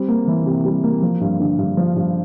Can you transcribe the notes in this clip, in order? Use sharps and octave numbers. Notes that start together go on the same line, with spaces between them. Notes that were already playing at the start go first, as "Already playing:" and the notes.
Already playing: G3 C4
A#3
E3
C3
G3
A#3
F3
G2
D3
G2
F3
G2